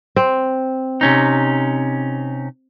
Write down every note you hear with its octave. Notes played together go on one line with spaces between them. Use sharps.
C4
C3 C#4 D#4